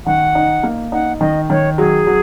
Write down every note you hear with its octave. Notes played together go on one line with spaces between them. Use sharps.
D#3 F#5
D#4
A#3
D#4 F#5
D#3 D#5
D#3 C#5
F#3 G#4
F#3